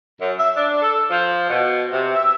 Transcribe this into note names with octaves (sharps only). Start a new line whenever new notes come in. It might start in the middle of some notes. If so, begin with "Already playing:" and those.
F#2
E5
D4
A4
F3
B2
C3
E5